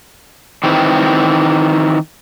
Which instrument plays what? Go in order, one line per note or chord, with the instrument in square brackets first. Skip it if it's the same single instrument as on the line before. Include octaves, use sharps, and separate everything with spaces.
[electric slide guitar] D#3 E3 C4